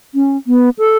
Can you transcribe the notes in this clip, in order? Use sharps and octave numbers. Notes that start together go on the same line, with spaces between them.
C#4
B3
A4